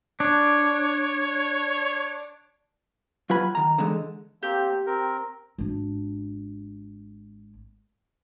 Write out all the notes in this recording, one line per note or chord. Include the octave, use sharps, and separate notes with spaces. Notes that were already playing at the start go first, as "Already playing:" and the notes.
D4 C#5
F#3 F4 B4 G#5 B5
D#3 A#5
D3 E3 G#3
A#3 C4 G4
C4 A#4
G#1 D4